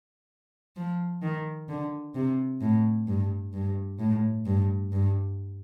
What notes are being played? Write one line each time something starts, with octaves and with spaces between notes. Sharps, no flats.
F3
D#3
D3
C3
A2
G2
G2
A2
G2
G2